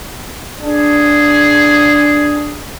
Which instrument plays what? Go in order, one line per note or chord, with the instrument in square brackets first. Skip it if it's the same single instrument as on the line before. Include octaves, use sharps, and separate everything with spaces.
[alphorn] D4 [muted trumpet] G#4